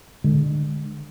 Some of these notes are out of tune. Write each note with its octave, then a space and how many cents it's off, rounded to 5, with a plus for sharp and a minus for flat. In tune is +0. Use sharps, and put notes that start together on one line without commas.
D3 +25 G#3 +0